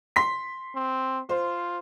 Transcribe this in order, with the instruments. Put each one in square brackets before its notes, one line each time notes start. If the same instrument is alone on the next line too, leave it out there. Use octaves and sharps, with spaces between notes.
[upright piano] C6 B6
[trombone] C4
[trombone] F4 [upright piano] C5